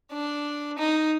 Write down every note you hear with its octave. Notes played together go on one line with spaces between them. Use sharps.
D4
D#4